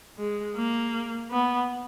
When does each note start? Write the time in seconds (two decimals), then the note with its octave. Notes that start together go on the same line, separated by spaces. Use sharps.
0.18 G#3
0.56 A#3
1.31 B3